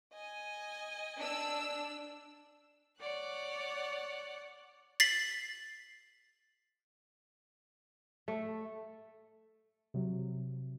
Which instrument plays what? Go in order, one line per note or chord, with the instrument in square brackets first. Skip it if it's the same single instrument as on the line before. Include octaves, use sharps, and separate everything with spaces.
[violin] D#5 G#5
[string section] D4 E6
[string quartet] C#5 D5 F#5 F#6
[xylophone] A6 B6 C7 F#7
[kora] A3
[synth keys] C3 F#3